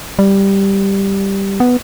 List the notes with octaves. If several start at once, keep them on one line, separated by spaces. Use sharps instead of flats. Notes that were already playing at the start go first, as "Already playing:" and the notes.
G3
B3